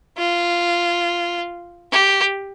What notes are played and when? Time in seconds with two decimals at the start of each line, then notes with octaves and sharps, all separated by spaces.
0.17 F4
1.92 G4